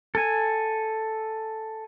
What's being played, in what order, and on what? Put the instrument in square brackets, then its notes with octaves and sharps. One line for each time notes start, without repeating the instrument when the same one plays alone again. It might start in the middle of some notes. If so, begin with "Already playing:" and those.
[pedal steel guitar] A4 G#5